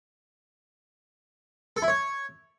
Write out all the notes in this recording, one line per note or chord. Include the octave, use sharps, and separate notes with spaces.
A4
E4
C#5